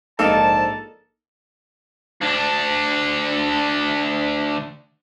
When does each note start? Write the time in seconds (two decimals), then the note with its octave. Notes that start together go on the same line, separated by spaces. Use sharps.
0.19 A#1 G#2 A#3 D#4 A4 A5
2.21 D2 D4